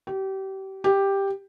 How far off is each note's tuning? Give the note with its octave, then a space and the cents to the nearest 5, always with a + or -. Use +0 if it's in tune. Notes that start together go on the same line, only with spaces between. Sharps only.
G4 -30
G4 +5